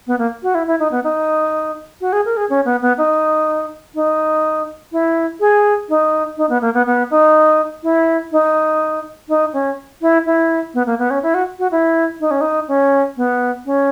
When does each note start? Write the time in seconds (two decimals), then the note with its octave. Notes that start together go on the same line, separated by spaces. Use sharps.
0.07 B3
0.19 A#3
0.43 F#4
0.55 E4
0.67 E4
0.80 D#4
0.92 B3
1.04 D#4
2.01 F#4
2.13 G#4
2.25 A#4
2.37 G#4
2.50 C#4
2.65 B3
2.82 B3
2.98 D#4
3.95 D#4
4.92 E4
5.40 G#4
5.89 D#4
6.37 D#4
6.49 B3
6.61 A#3
6.74 B3
6.86 B3
7.10 D#4
7.83 E4
8.32 D#4
9.29 D#4
9.53 C#4
10.01 E4
10.26 E4
10.74 B3
10.86 A#3
10.99 B3
11.10 C#4
11.23 E4
11.34 F#4
11.59 F#4
11.71 E4
12.20 D#4
12.31 C#4
12.41 D#4
12.68 C#4
13.17 B3
13.66 C#4